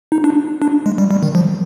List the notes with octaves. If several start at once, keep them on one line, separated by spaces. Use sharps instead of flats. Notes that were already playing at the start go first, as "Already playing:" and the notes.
D#4
D4
D4
G#3
G3
G3
D#3
F3